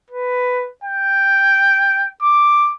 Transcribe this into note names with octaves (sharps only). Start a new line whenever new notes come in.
B4
G5
D6